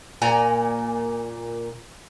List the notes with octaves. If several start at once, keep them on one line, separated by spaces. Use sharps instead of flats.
A#2 G#5 A#5